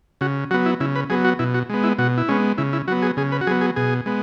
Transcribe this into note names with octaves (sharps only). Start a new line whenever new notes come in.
C#3 F#4
F#3 B3 F#4
E4
C#3 E4
B4
F#3 B3 G#4
F#4
B2 E4
F#4
G#3 B3
E4
B2 F#4
E4
G#3 B3 C#4
C#3 E4
E4
F#3 B3 F#4
G#4
C#3 G#4
B4
F#4
F#3 B3 G#4
G#4
B2 G#4
G#3 B3